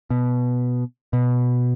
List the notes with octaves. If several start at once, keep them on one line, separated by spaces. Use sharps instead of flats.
B2
B2